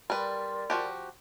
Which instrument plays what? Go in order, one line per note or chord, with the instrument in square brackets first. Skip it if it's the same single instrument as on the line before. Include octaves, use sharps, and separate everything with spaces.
[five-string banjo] G3 B4 [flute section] A#4 D5 C6
[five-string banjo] F3 F#4 G4